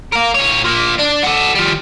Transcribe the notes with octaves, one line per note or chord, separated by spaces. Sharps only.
A#4 F5
A#2 C#5
F3 A#3
D4
F#4 A4
F3 G3